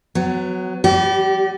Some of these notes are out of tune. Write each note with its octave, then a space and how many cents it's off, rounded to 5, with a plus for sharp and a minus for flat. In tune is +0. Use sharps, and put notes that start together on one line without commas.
F#3 +0 B3 +30
G3 +0 G4 -40 D5 -35